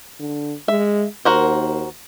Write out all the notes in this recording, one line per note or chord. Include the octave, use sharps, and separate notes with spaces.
D3
G#3 E5
D#2 F#4 A#4 C5